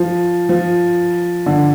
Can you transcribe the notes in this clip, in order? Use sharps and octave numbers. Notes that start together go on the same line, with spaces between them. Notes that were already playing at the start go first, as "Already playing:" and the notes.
Already playing: F3
F3
D3